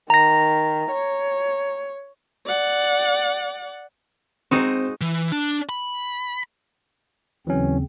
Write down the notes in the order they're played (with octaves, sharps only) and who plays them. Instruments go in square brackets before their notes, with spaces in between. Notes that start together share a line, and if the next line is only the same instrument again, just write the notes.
[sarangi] D#3 [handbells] A#5 A#6
[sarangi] C#5
[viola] D5 F#5
[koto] G#3 D#4 F#4 [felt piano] C4 C5
[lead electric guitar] E3
D4
B5
[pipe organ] D#2 C#3 C4 [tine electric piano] E3 F#3 C#4